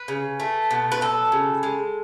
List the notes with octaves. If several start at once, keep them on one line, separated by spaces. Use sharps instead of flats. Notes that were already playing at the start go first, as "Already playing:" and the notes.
Already playing: B4
C#3
A3
B2
B4
F#3 A4
C#3
G#3